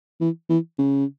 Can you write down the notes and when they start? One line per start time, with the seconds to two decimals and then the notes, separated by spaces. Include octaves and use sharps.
0.21 E3
0.49 E3
0.78 C#3